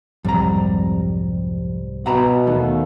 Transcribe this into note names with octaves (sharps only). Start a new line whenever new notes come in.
C2 F2 G#2 F#3 G3 A#5
B2 E5 F#5 A#5 B5
D#2 A3 B3